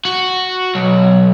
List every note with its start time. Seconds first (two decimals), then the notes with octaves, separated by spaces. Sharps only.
0.05 F#4
0.75 B1